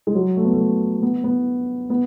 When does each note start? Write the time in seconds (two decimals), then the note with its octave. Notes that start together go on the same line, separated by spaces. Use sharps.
0.07 G#3
0.15 F#3
0.37 A3
0.45 B3
0.53 A3
1.03 B3
1.24 B3
1.90 B3